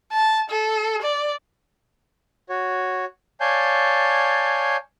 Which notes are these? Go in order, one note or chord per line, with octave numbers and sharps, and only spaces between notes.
A5
A4
D5
F#4 C#5
C#5 D5 F5 G#5 A5 G6